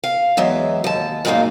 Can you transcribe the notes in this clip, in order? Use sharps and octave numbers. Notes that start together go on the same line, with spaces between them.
F5
E2 F#3 G#3 E5
D#2 A5
F#2 A#2 G#3 A#3 D#4 F5